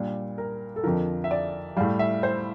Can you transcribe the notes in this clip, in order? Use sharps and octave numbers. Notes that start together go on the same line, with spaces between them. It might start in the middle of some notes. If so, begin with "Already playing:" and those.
Already playing: A#2 G3 D4
A#4
A4
F2 D3 F3 A#4
E5
D5
A2 G3 F5
E5
C5